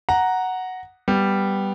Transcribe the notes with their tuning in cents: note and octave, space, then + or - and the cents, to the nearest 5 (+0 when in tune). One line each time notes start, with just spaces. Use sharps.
F#5 +0 A#5 +0
G3 +0 B3 +0